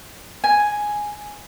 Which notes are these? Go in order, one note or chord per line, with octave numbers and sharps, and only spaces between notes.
G#5